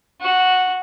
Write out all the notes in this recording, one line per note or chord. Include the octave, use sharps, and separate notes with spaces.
F#4